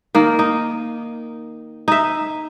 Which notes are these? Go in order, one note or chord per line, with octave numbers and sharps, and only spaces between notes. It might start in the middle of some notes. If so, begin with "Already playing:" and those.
D#3 A#3
D#4
D#4 E5